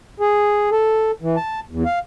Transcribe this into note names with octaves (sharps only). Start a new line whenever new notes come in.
G#4
A4
E3
A5
E2
F5